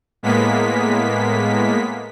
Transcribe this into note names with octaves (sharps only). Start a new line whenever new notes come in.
A2 G#3 A#3 B3 B6